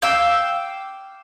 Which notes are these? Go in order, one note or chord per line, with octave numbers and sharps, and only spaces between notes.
F5 G5 D6 E6